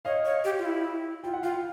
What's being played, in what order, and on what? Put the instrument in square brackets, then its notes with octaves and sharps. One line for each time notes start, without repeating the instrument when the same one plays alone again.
[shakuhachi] C#5 [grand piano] D#5 F5
[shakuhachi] C#5
G4
F4
E4
[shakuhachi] F4 [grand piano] G5
[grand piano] F#5
[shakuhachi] F4 [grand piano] F5 G5